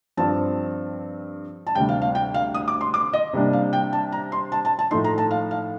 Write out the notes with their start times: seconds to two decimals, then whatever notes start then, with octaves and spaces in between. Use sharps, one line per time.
0.17 G2 F3 C4 A5
1.67 A5
1.75 D2 C3 G3 G5
1.89 F5
2.02 F5
2.15 G5
2.34 F5
2.54 D#6
2.68 D6
2.81 C6
2.94 D6
3.13 D#5
3.33 C3 G3 A#3 D4
3.53 F5
3.73 G5
3.93 A5
4.12 A#5
4.32 C6
4.52 A5
4.65 A5
4.79 A5
4.91 A2 F3 A3 D#4 C6
5.04 A#5
5.18 A5
5.31 F5
5.51 F5